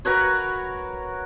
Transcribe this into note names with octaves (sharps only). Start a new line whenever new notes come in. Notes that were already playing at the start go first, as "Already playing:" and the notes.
F#4 A#4 B4 C#5